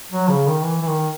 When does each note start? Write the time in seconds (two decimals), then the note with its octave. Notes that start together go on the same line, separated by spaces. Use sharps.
0.11 F#3
0.29 C#3
0.47 D#3
0.64 E3
0.81 E3
0.87 D#3